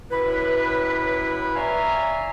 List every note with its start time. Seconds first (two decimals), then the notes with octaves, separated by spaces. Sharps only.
0.11 F#2 A2 E4 B4
1.56 C#5 D5 E5 F5 G#5 A#5